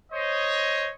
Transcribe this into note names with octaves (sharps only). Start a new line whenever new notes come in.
C5 C#5 D#5